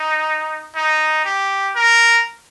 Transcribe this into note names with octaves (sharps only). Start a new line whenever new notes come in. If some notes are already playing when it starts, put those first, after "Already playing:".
Already playing: D#4
D#4
G4
A#4